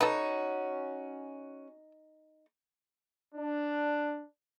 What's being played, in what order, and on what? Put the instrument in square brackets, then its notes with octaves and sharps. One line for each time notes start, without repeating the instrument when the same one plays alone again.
[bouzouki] C#4 F#4 [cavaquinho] D#4 [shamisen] A4 B4
[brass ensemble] D4